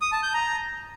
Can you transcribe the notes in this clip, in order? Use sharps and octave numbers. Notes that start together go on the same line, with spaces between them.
D#6
A5
G6
A#5